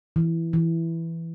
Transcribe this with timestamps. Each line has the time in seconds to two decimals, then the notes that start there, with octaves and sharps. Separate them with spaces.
0.16 E3
0.53 E3